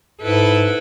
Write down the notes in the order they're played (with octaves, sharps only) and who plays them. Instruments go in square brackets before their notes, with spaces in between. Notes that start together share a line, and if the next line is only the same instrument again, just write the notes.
[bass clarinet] G#2 [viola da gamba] E4 A4 B4